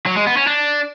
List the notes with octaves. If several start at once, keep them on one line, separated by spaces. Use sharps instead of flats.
F#3
G#3
B3
C#4
D4